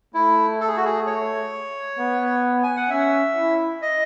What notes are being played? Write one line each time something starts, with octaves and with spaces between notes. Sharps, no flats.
A3 E4
A4
G#4
F#4
G#4
C#5
B3
G#5
F#5
C#4 E5
E4
D#5